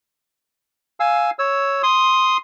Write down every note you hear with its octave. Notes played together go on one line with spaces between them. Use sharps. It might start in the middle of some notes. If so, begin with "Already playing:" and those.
F5 G#5 E6
C#5 E6
C6 D#6